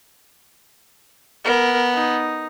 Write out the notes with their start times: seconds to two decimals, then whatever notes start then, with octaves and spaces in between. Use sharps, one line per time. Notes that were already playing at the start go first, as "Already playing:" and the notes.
1.45 B3 A#4
1.94 D#4